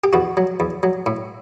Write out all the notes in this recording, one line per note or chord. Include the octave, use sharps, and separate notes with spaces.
G4
E2 F#4
F#3
E2
F#3
A2